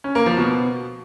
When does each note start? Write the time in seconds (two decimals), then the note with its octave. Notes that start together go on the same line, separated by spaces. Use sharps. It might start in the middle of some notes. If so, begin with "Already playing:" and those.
0.04 C#4
0.15 A#3
0.26 F3
0.37 B2